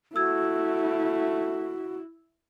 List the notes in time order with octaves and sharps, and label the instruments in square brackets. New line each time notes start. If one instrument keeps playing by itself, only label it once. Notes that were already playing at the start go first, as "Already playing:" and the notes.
[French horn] A3 [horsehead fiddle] E4 [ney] F#4 [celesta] E6 G#6